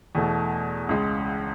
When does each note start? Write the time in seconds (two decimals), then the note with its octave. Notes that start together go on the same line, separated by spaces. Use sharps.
0.15 E2 B2 A3
0.89 C#2 C#3 G#3